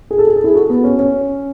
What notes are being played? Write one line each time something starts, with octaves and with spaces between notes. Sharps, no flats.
G#4
A4
G#4
A4
E4 G#4
F#4 A4
B3
C#4
C#4